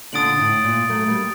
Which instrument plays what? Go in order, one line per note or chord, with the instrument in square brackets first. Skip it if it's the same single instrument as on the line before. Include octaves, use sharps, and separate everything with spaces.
[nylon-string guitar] A#2 D3 [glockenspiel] D#6 A6 D7 F#7
[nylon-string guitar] A2
A#2
F#3 A3
G3 A#3